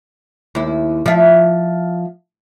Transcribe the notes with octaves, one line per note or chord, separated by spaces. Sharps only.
D#2 E4
F3 E5